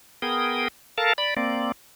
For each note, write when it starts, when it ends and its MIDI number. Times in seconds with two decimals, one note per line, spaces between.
0.22 0.68 59
0.22 0.68 68
0.22 0.68 70
0.22 0.68 79
0.22 0.68 87
0.98 1.13 69
0.98 1.13 70
0.98 1.13 77
0.98 1.13 81
1.18 1.34 74
1.18 1.34 83
1.37 1.72 58
1.37 1.72 60
1.37 1.72 74